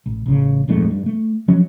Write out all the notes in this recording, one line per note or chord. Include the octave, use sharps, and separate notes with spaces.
A1
A1 C#3
D#1 F2 G#2 A3
G2
A3
F3 F#3 C#4